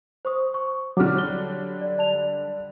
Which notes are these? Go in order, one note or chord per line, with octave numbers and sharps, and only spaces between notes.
C5 C#6 D#6
C#6
D3 F#3 G3 D4 D6 F6
C#5 G7
D5
D5 A5 F7